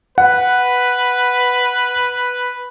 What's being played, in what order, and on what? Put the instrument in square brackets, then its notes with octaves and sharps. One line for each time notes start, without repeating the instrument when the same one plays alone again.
[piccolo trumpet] B4 [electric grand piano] F#5